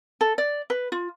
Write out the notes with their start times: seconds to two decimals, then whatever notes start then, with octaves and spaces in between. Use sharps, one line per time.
0.21 A4
0.38 D5
0.70 B4
0.92 F4